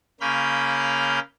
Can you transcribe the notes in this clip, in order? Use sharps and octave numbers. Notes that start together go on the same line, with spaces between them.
C#3 A#3 C#4 B5 F6 G6